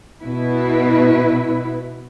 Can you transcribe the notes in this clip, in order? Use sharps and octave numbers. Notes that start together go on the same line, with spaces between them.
B2 E4 B4